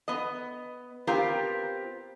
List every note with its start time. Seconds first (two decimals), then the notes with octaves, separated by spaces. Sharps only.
0.08 B3 D#5
1.07 B3 C4 F4 G4 A#4